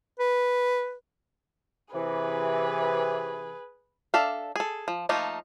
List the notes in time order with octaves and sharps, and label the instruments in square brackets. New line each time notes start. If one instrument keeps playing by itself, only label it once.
[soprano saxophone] B4
[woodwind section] C3 E3 [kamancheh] G#4 B4
[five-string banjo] D4 A4 E5 F5
G#4 A4
F3
F3 A3 A#3 D#4 F4